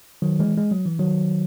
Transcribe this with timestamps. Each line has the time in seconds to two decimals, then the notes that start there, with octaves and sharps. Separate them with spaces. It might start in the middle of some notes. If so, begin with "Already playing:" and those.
0.22 D#3 F#3
0.40 E3 G#3
0.57 G#3
0.71 F#3
0.86 E3
0.99 D#3 F#3